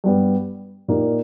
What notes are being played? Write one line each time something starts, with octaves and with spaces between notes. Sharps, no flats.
G2 G3 B3
A#2 A#3 D#4 G4